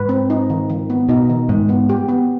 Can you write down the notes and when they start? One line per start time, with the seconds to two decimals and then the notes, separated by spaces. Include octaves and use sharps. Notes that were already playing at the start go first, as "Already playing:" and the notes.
Already playing: G#2 B4
0.09 C4
0.30 D#4
0.50 D#3
0.70 D#3
0.90 B3
1.09 B2 D#4
1.30 D#3
1.49 G#2 D#3
1.69 B3
1.89 G4
2.09 B3